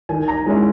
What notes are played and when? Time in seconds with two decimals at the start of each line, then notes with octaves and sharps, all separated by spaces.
0.09 D#3 G#5
0.28 A#5
0.46 G#3 C#4 E4